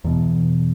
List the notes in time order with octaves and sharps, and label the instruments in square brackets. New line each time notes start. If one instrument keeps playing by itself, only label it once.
[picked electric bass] E2 B2